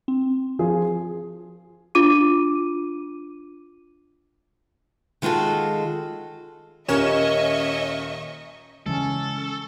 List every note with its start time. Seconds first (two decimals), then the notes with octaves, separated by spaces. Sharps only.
0.08 C4
0.59 F3 F4 G#4
1.95 D4 F4 D6 D#7
5.22 D#3 G#3 F4 F#4 A4
6.88 D#1 C#4 A#4 C#5 D#5 E5 C#6 E7
8.86 C#3 E3 G#3 C#4 A4